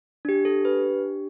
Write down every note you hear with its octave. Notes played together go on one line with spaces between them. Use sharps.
D4 G4
A4
B4